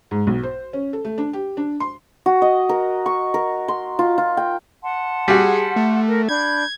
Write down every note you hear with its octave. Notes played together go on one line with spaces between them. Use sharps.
G#2
B1
C5
C#4
A4
A3
D4
G4
D4
C6
F#4
D#5
A#4
C#6
A#4
C6
F4
F4
G5
F#5 A5 C6
G3 F#4 G#4
A3
A#4
D4 B5 G6 G#6